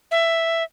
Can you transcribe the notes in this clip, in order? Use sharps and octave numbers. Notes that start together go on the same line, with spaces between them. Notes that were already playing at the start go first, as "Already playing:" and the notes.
E5